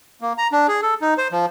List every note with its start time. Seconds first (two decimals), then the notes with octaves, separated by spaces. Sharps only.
0.21 A#3
0.38 A#5
0.52 D4
0.68 G#4
0.82 A4
1.01 D#4
1.18 C5
1.32 F3